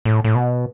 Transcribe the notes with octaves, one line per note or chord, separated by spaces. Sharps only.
A2
A2
B2